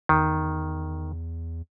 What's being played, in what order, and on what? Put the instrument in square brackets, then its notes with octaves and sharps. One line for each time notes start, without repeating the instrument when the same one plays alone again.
[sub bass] E2 [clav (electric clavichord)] D#3